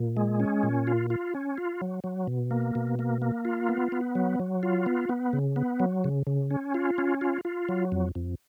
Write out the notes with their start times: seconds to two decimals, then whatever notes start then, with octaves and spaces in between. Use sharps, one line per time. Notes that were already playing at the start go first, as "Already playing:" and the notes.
Already playing: A#2
0.17 G#3
0.40 C#4
0.63 A#2
0.87 F4
1.10 F4
1.35 C#4
1.58 F4
1.81 F#3
2.04 F#3
2.27 B2
2.51 A#3
2.75 B2
2.99 A#3
3.22 A#3
3.45 F4
3.69 B3
3.92 B3
4.15 F#3
4.40 F#3
4.63 F4
4.86 B3
5.09 B3
5.33 C#3
5.56 B3
5.80 F#3
6.04 C#3
6.27 C#3
6.51 C#4
6.74 F4
6.98 C#4
7.21 F4
7.45 F4
7.69 F#3
7.92 F2
8.15 F2